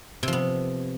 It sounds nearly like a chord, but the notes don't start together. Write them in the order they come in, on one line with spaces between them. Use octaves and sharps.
C3 F3 B3